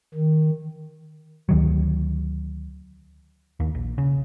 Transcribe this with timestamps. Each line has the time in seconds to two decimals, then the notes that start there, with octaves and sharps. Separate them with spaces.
0.14 D#3
1.49 D2 D#3 F#3
3.60 D#2
3.75 A#1
3.98 C#3